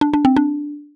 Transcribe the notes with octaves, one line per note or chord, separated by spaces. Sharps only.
D4
D4
C4
D4